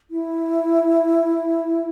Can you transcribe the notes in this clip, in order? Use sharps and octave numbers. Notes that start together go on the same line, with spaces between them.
E4